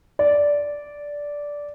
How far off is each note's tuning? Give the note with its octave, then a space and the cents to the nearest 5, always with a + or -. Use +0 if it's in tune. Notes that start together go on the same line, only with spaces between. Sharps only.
D5 -10